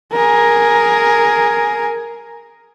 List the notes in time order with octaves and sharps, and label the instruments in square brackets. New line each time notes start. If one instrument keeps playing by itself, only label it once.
[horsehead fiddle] G#4 A#4